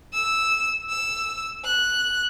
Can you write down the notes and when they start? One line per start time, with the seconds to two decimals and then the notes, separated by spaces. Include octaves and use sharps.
0.13 E6
0.89 E6
1.65 F#6